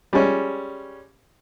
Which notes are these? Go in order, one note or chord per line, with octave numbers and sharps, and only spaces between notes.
G3 G#3 C#4